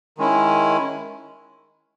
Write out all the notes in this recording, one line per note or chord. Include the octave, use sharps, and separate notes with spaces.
D#3 G#3 C#4 E4